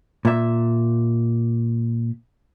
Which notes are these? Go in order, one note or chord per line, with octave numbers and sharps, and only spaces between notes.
A#2 E5